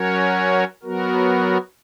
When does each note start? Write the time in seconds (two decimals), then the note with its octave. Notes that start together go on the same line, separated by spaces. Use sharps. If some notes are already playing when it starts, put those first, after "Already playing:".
Already playing: F#3 C#4 F#4 A#4 C#5
0.83 F#3 B3 F#4 A#4